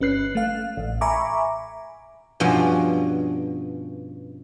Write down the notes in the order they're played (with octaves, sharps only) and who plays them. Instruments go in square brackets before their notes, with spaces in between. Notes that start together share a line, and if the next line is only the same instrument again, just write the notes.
[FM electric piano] G1 C#4 B4 F#6 C7
A3 F5
A1
E5 G#5 A#5 B5 C#6 D6
[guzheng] G2 B2 F3 C#4